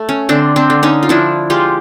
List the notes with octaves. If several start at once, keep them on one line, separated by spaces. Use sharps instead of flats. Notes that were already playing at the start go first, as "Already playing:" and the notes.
Already playing: A3
C#4
D3 C4 D4
C4 D4
D3
C#4 D#4
F4
F3 D4 E4
G#3 F4 G4